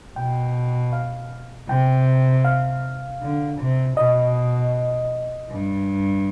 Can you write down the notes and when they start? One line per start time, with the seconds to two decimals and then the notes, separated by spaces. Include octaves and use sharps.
0.16 B2 G5
0.93 F5
1.69 C3 G5
2.45 F5
3.22 D3
3.59 C3
3.97 B2 D#5
5.50 G2